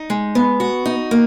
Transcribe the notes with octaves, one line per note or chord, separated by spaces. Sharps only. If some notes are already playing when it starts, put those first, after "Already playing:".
Already playing: D#4
G#3
B3
F#4
D#4
A#3